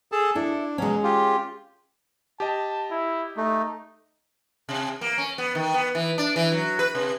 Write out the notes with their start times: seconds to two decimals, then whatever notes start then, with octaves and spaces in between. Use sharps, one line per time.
0.12 G#4 A4 A5
0.35 D4 E4 A4
0.78 B2 F#3 G#3 C#4
1.03 F4 G4
2.40 G4 D#5 A5
2.91 E4
3.37 A3 D#4
4.69 C3
5.01 A#3
5.18 C#4
5.38 B3
5.55 D#3
5.74 B3
5.95 E3
6.18 D4
6.36 E3
6.52 F#3
6.79 B4
6.95 C3